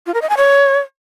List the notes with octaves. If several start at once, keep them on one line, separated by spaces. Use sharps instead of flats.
F4
A#4
D#5
G#5
C#5